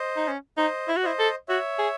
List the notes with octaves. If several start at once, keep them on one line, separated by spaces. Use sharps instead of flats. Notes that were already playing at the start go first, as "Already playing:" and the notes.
Already playing: C5 D#5
D#4
C#4
D#4 C5 D#5
E4
F#4
E4 C5 D#5
A4
F#4 C#5 E5
G#4